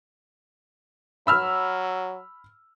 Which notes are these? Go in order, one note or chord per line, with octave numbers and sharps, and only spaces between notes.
F#3 B5 E6 F6